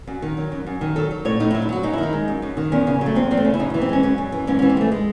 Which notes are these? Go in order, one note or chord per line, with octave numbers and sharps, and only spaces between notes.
F#2
D#3
F#3
F#2
F#2
D#3
F#3 A4
F#3
A2 C#5
A2 D#4
E4
F#3
E4
F#3 F#4
F#2 D#4
E4
D#3
D#4
G#3
F#2
F#2
D#3
E2 C#4
C#3
F#3
A3
E2 C4
E2 C4
A3
C#3
E4
F#2 D#4
E4
E3
C4
G#3 C#4
F#2 C#4
F#2
E3
G#2 C#4
C#4
E3
C4
G#3
A3
G#3